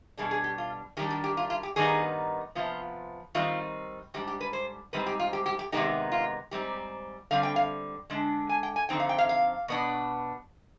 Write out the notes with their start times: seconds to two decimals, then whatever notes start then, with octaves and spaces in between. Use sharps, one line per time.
0.17 B2 G3 D4 G#4
0.31 G#4
0.44 G4
0.58 F4
0.97 D#3 G4
1.00 G3 D4
1.11 G4
1.24 G4
1.37 F4
1.50 F4
1.63 G4
1.76 G2 D#3 G3 B3 D#4 G#4
2.55 C3 F3 B3 F4
3.35 D#3 G3 C4 D#4 F4
4.14 G#2 G3 D4 G4
4.27 G4
4.41 B4
4.53 C5
4.93 G#2 G3 C4 D#4 B4
5.07 G4
5.19 F4
5.33 G4
5.46 G4
5.59 G4
5.72 C3 D#3 G#3 B3 D#4 G4
6.12 F4
6.51 G#2 G3 C4 D#4 G4
7.31 D3 G3 C4 F5
7.43 G5
7.56 F5
8.10 D3 G#3 D4
8.49 G#5
8.63 G5
8.76 G#5
8.89 F2 D3 G3 C4 D#4 G5
9.00 F5
9.09 G5
9.18 F5
9.29 F5
9.68 B2 B3 D4